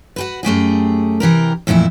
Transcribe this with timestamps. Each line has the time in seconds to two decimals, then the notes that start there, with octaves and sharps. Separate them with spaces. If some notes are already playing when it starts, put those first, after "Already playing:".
0.16 F#4 G4 B4
0.43 F#2 A3 G4 G#4
1.20 C3 E3 G4 A#4
1.67 F2 A#2 E3 A3 E4